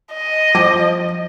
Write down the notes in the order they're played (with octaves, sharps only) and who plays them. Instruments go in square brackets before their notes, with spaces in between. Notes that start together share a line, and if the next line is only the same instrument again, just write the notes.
[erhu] D#5
[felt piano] F3 D6 A#6